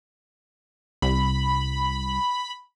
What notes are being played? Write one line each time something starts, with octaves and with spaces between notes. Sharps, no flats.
C2 B5